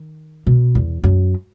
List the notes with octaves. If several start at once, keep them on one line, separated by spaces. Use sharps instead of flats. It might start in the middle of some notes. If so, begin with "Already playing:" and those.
Already playing: D#3
B2
E2
F#2